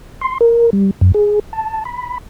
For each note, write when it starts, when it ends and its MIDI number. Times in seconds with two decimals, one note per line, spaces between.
0.21 0.38 84
0.41 0.70 70
0.73 0.91 55
1.01 1.12 42
1.14 1.39 68
1.53 1.84 81
1.85 2.18 83